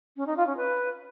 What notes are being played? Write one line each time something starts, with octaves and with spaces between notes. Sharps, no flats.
C#4
D#4
F4
C#4
B4